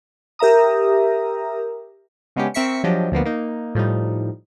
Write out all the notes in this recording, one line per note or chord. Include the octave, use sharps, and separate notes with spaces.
G4 A#4 E5 A#5 D#6
C#3 G#3 B3 C#4 D4 G4
C4 A#4 E5 C#6 B6 C#7
F3 F#3 D4 G4 D#5
D2 F3 A#3 B3
A#3 D#4
A2 F3 G3 D#4